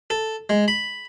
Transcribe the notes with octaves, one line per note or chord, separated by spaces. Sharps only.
A4
G#3
B5